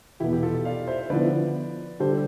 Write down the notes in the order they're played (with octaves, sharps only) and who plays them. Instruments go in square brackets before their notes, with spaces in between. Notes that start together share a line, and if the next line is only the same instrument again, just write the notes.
[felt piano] E2 B2 B3 [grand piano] E4 G4
[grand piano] G4
F4 A4
D5 F5
C5 E5
[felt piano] D3 F3 B3 E4 [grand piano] B4 D5
[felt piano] D3 G3 D4 G4 [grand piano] A4 C5